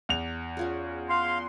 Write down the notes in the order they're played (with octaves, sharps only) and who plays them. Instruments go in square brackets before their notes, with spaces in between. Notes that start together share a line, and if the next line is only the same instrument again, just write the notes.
[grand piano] E2 F7
[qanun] C#4 F4 G#4
[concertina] F5 [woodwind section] C6